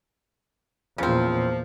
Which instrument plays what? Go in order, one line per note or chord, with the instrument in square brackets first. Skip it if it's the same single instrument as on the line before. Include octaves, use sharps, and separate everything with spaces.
[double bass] E2 A#2 [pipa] C#3 C4 [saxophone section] F3